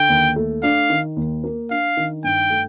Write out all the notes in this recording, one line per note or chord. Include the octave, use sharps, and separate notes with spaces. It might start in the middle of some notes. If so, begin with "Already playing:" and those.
Already playing: D3 G5
D#2
A3
D4 F5
D#3
D#2
A#3
D4 F5
D#3
G2 G5
A3